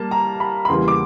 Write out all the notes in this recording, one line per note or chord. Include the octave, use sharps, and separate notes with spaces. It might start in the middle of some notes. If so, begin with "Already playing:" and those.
Already playing: G3 A#3 A5
A#5
B5
B5
E2 C#3 E3 G3 A#3 C6
D6